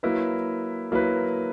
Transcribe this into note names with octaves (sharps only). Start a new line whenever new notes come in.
F#3 A#3 E4 B4
F#3 A#3 E4 B4